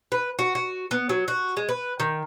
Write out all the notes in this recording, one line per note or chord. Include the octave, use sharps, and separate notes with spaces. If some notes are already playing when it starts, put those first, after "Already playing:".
B4
F#4
F#4
B3
F#3
F#4
G#3
B4
D#3